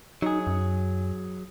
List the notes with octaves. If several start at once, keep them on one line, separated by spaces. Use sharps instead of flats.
F#3 D#4 G#4
F#2